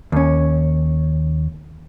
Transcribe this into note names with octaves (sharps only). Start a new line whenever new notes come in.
D#2 C#4